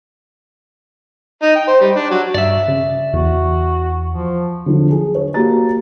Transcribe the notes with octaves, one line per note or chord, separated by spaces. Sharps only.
D#4
G5
C5
G3
D4
F#3
G2 D5 E5
C#3
E2 F#4
F3
D3 F3 F#3
G#4
C#5
A#3 F#4 G4 A#5 A6